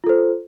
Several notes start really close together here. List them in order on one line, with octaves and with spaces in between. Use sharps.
F4 A4 C5